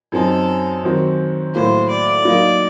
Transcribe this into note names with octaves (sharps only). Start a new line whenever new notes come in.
F#2 F#3 C4 D#4 A4
D#3 F#3 C4 F#4
A2 F#3 A#3 C5
D5
F#3 A#3 D#4